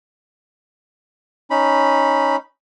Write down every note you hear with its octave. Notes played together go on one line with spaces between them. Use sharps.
C#4 D#4 B5